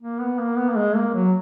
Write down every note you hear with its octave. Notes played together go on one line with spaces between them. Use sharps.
A#3
B3
A#3
B3
A#3
G#3
A#3
F#3